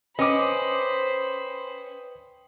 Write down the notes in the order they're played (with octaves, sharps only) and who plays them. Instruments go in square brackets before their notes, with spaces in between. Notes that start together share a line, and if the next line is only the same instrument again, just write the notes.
[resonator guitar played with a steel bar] C#4 [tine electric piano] B4 G5 D#6 [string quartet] C5 B5 [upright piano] D#5 D6